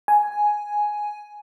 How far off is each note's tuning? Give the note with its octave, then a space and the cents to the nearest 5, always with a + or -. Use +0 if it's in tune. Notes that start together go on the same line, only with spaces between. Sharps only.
G#5 +5